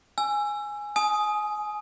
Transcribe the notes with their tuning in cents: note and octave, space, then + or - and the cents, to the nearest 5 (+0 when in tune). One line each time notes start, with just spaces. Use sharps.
G#5 +0 E6 +25
G#5 +25 D#6 +5